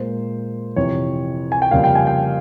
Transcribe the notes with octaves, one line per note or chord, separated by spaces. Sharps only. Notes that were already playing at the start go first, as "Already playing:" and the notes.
Already playing: A#2 G#3 C5
F2 C3 E3 C#5
G#5
G5
F2 C#3 G3 A#3 F5
G5
G#5
G5